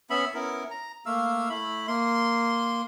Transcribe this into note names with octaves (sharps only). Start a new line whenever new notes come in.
B3 C#4 E5 B5
B3 C#4 E4 A#4
A#5
A3 A#3 F5 E6
A3 E4 B5
A#3 C6